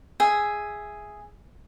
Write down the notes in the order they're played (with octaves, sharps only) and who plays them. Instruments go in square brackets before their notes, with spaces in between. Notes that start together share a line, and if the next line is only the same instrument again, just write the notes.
[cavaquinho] G#4 E5